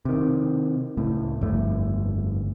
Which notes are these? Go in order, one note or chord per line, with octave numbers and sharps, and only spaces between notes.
C3 D#3
C#2 A2
G1 F2 A3